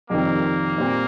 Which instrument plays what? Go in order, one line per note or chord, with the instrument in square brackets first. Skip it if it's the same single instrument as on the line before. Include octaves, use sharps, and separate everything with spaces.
[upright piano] F2 C3 D#3 G3 C4 [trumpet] A#3
[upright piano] A#2 G3 C4